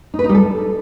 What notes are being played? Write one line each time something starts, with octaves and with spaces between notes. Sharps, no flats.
D#4
B4
D#4
G3
A4